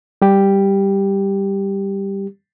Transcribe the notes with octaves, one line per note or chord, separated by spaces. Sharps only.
G3 G4